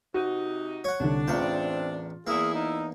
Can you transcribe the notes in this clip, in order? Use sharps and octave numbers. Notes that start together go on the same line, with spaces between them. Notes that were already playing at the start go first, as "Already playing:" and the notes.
C3 D#4 F#4
C#5 F#5
C2 D3 D4
A1 E2 C4 F4 G5
E2 A#3 E4 G#4
D#4